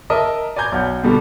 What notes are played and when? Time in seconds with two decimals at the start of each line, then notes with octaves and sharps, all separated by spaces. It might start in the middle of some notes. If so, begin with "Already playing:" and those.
0.10 A#4 D#5 E5 A5 D#6
0.56 D5 G#5 A#5 G6 G#6
0.72 B1 F#5 G6
1.03 B2 D3 G3